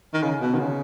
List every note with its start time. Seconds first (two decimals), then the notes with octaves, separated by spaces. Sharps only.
0.14 D#3
0.23 C#3
0.41 B2
0.55 D#3
0.60 C#3